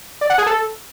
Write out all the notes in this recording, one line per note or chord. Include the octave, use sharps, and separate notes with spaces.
D5
F#5
G#4
A4